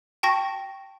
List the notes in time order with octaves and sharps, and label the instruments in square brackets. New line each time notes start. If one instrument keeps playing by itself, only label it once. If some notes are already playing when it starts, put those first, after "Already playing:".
[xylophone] G5 A5 C#6 A#6